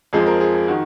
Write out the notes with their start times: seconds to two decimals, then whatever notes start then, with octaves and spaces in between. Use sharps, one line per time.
0.13 F2 F3 G#3 G#4
0.26 A#4
0.40 G#4
0.54 G#4
0.68 D#3 F#4